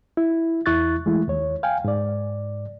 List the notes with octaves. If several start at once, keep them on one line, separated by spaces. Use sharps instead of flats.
E4
E2 E4 C#6 F#6 A6
E3 G#3 A3 E4
D#2 C#5
F5 G5 G#5
G#2 D5